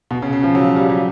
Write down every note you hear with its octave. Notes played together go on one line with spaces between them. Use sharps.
B2
C#3
C#3
F3
F#3
G3
F#3